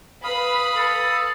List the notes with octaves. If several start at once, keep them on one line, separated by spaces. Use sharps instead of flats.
B4 F5 B5 D#6
A4